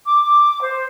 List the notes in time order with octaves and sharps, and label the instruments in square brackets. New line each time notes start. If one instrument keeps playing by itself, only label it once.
[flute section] D6
C5